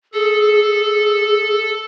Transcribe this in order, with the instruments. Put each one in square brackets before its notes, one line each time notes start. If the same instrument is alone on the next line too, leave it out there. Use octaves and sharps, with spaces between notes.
[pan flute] G#4 [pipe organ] A4